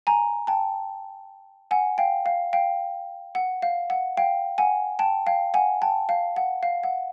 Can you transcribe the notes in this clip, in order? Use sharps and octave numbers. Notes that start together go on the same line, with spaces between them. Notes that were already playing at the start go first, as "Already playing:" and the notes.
G#5 A#5
G5 A5
F#5 G#5
F5 G5
F5
F5 G5
F#5
F5
F#5
F5 G5
F#5 G#5
G5 A5
F5 G5
F#5 G#5
G5 A5
F5
F#5
F5
F#5